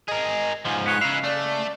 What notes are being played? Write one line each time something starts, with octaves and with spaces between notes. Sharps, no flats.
G#4 A#4 D#5
G#2 F3 G#5
B3 G#4 C#5 F#6
C#3 D#4 E4 F5
A3 D5